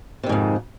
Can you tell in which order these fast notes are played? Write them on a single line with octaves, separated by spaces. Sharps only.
C3 D#3 G#2 F2